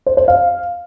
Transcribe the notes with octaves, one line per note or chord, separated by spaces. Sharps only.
C5
C5
F5